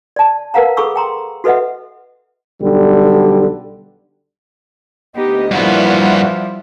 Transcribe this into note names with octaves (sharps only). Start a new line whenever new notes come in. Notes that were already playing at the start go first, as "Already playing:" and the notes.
D5 A5
A#4 B4 F5 F#5 A#5
G#4 A4 B5 C#6 E6
G5 A#5 C6
F#4 A4 B4 D#5 E5 F#5
B1 D3 G3
D2 B3 D#4 G4 D#5
G2 A#2 E3 F3 G3 B3 E4 F#4